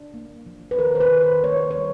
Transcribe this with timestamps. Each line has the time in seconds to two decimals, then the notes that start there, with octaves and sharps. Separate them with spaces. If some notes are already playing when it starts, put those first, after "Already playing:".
Already playing: D4
0.14 A#3
0.46 F3
0.71 B4
0.79 D#3 A#4
0.95 C5
1.00 B4
1.11 D#3
1.22 C5
1.44 A#3 C#5
1.57 C5
1.71 C#5
1.77 G3